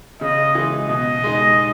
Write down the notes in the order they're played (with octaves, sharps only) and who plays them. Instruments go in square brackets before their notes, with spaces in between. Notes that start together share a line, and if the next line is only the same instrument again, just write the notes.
[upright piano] C#3 [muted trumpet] D#5
[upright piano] E3 G#3
[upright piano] B2 [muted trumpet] D#5
[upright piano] G#3 D#4